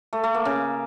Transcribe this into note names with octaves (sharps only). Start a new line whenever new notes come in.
A3
A3
A#3
C#3